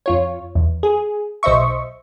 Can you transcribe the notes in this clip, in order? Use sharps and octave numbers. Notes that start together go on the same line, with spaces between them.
F2 F4 C#5
E2
G#4
B1 C5 D#5 E5 C#6